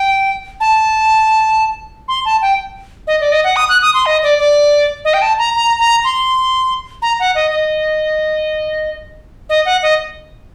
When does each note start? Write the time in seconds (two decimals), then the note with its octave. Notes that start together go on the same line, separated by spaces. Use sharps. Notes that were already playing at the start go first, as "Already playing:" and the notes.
Already playing: G5
0.60 A5
2.08 C6
2.25 A5
2.42 G5
3.07 D#5
3.20 D5
3.32 D#5
3.44 F#5
3.56 D#6
3.69 F#6
3.82 D#6
3.94 C6
4.06 D#5
4.23 D5
4.38 D5
5.05 D#5
5.14 G5
5.22 A5
5.38 A#5
5.55 A#5
5.79 A#5
6.04 C6
7.02 A#5
7.20 F#5
7.35 D#5
7.52 D#5
9.49 D#5
9.65 F#5
9.82 D#5